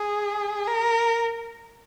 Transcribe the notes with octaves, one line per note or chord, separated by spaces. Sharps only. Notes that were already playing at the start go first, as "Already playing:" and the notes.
Already playing: G#4
A#4